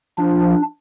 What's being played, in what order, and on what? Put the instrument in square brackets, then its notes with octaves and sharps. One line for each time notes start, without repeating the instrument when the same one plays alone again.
[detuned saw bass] F3 [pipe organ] D4